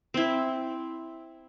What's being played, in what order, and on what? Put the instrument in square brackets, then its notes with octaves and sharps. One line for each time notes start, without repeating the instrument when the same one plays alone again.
[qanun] C4 E4